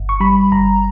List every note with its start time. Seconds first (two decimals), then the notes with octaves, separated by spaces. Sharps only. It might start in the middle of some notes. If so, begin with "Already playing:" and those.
Already playing: G1
0.09 C#6
0.20 G3 B5
0.52 G1 A#5